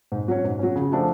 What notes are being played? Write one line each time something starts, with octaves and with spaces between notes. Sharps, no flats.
G#2
F#3 C#4
G#2
F#3 C#4
C#3
F3 A3 D4 F#4